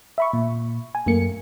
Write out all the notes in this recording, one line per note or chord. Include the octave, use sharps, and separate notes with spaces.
E5 B5 C#6
A#2
G#5
F#2 A3 A#3 C#7